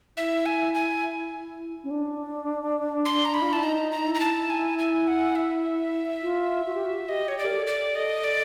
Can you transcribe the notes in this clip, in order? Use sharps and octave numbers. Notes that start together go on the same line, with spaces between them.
E4 E5
G#5
G#5
C#4
D4
C6
A#5
B5
F4
E4 A5
D#4 A#5
A#5
D#4
E4
A#5
A5
G#5
G#5
F#5
E5
F4
F#4
G4
F#4
G4 D#5
C#5
D5
A#4
A4
D5
A4 D#5
D5